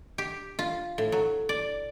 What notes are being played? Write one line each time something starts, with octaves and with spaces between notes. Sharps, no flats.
G4
F4
A2
F#3
D5